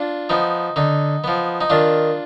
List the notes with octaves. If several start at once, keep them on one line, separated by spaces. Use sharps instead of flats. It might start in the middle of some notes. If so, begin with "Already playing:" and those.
Already playing: D4 F4
F3 B3 D#4
D3 D#4
F3 B3
D#4
D#3 D4 F4